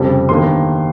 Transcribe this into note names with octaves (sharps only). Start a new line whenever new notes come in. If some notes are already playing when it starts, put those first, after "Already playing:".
Already playing: F1 F2 C#3 G3
G1 G2 D#3 A#3 C6